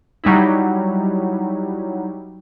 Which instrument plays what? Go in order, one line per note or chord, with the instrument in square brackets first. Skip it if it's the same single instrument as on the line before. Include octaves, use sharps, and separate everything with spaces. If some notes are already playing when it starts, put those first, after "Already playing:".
[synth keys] F#3 G3 D#4 E4